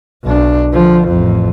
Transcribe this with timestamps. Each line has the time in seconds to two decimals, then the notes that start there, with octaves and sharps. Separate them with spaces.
0.24 B1 D4
0.71 D3 F3
1.08 A1 F2